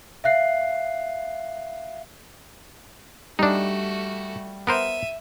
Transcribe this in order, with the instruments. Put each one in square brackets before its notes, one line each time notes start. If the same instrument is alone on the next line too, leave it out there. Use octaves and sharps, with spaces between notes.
[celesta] E5 F5 F#6 C7
[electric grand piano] G3 [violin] A3 F#4 [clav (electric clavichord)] D4 D#4
[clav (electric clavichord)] B3 A#4 C5 [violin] E5 D#7